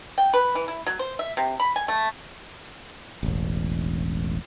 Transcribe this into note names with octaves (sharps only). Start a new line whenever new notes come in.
G5
B4
E3
E4
F#3
C5
E5
C3
B5
G#5
A3
E1 A1